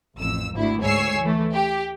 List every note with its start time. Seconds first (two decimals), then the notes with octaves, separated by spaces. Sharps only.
0.17 A1 F2 E6
0.54 G#1 D2 E4
0.83 D2 G#2 C#5 G#5 E6 C7
1.21 E3 A3
1.53 G4